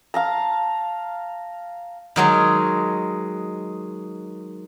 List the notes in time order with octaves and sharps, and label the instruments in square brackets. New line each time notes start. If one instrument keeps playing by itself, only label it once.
[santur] F5 A5 A#5
[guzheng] D#3 F#3 G#3